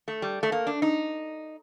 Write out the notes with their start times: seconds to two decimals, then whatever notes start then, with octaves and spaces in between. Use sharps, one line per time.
0.08 A3
0.22 G3
0.43 A3
0.52 A#3
0.67 D4
0.82 D#4